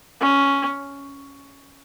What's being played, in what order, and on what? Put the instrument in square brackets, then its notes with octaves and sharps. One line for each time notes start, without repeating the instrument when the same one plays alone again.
[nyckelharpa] C#4